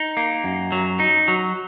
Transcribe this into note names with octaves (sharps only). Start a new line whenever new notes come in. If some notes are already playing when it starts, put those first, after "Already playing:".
Already playing: D#4
A#3
F#2
F#3
D#4
F#3